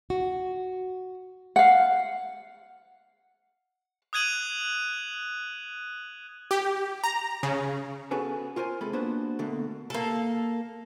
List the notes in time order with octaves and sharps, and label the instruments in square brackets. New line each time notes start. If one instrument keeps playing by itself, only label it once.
[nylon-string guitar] F#4
[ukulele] F5 F#5
[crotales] D#6 F#6 G#6 D#7 F#7
[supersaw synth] G4
A#5
C#3
[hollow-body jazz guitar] B3 C#4 F#4 G#4 A4 B4
F4 A#4 C5 G#5
C3 G#3 A4 B5
A#3 B3 D4 F#4 B4 C5
B2 D3 A3 A#3
[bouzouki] A#3 A4